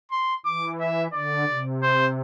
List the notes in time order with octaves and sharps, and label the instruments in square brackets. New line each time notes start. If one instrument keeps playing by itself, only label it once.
[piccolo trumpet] C6
[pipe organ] E3 [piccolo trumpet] D6
[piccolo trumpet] E5
[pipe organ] D3 [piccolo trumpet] D5
[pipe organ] C3
[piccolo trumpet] C5